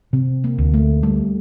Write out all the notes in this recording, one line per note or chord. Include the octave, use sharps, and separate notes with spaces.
C3 C4
A#3
D2
A3
G3 A3